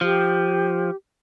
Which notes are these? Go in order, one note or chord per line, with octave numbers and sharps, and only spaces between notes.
F3 G4